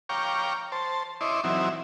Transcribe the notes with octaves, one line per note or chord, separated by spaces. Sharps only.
C#5 F5 G5 A#5 C#6 D6
C5 A5
E4 C#5 D#5 C6 D6
E3 F#3 C4 D#4 E4